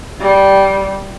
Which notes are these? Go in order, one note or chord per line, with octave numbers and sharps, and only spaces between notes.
G3